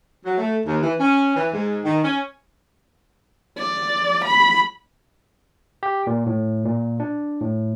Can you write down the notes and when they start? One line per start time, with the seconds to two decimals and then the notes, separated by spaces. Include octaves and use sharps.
0.25 F#3
0.38 A3
0.66 D#2
0.82 E3
1.00 C#4
1.36 E3
1.53 G#2
1.85 D#3
2.04 C#4
3.58 D5
4.25 B5
5.83 G4
6.07 A#2
6.26 A2
6.65 A#2
7.00 D4
7.41 A2